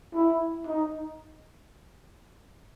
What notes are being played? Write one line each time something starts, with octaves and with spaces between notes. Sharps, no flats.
E4
D#4